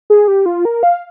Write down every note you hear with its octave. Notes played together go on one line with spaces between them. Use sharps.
G#4
G4
F4
A#4
F5